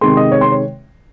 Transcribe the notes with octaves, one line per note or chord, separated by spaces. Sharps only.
C3 D#3 G#3 C6
D#5
C#5
C6
C#5